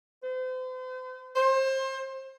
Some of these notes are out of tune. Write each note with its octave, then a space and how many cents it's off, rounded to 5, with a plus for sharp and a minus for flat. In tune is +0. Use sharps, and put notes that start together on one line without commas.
C5 -40
C5 +30